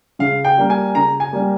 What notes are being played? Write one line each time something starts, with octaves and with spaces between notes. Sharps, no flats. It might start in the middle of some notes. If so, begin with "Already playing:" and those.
C#3 F5
G5
G3 A#3
G#5
C#3 A#5
G#5
G3 A#3